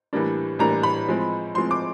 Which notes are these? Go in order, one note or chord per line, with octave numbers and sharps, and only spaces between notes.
A2 E3 G3 A#3 D4
A2 E3 G3 A#3 D4 A#5
B5
A2 F3 G#3 C4
A2 F3 G#3 C4 C6
D6